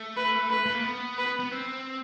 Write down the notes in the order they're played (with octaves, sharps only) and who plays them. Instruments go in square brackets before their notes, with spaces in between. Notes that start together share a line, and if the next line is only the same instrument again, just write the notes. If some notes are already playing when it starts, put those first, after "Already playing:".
Already playing: [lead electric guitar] A3
[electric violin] B4
B4
[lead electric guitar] A3
A#3
B3
[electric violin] B4
[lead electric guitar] B3
C4